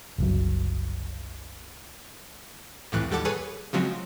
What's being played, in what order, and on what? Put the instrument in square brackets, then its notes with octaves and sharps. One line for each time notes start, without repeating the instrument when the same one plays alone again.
[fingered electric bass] F#1 C2 F#3
[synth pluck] C2 F2 A2 E3 F#6
D#2 G3 A4 F#5 A5 D6
G#4 A4 B4 C#5 G#5
C#3 F3 F#3 G#3 C4